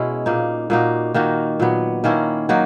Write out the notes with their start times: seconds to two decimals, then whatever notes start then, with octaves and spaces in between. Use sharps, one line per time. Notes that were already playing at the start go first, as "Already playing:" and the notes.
Already playing: B2 G#3 C#4 E4
0.26 A#2 A#3 D#4
0.70 A#2 A#3 D#4 F#4
1.14 D#3 A#3 D#4 F#4
1.60 A#2 F#3 B3
2.04 D#3 A#3 C#4 E4
2.49 F#3 A#3 D#4 F#4